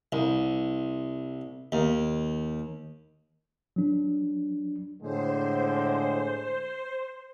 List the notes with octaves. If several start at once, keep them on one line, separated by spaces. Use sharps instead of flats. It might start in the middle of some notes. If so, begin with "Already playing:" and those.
C2
D#2
F#3 D4
A2 D3 G#3 C5